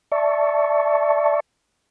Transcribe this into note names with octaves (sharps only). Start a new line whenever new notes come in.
D5 E5 A5 C#6